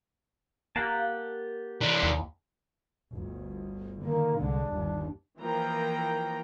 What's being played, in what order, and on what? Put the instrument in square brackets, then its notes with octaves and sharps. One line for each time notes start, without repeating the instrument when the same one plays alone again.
[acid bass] A#3 [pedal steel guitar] G4 F#5 A5
[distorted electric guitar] E3 D4
[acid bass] D#2
[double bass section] G1 D2
[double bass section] D3 D#3 [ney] A#3
[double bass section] C2 D3 G#3 [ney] D4
[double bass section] G1 D#2 G3
[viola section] E3 F3 A#3 G5 A#5